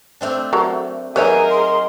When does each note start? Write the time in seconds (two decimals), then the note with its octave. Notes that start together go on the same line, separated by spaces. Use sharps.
0.21 A3 C4 D4
0.53 F#3 A4 A#4
1.16 F#3 D#4 G#4 A#4 B4 C#5 E5 G#5
1.51 C6